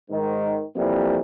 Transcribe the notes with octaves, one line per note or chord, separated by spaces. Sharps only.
G#2 D#3
F2 C3 E3 G3 A#3